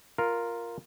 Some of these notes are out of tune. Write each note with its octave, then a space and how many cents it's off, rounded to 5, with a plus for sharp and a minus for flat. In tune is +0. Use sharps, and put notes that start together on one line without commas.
F4 +0 A#4 +0